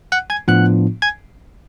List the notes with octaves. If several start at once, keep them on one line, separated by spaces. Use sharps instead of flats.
F#5 F#6
G#5 G#6
A2 F3 B3 D4 F4 F#5 F#6
G#5 G#6